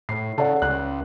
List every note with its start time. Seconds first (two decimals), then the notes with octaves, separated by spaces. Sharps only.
0.09 A2 C7
0.38 C#3 A4 D5 F#5
0.62 C#2 F#6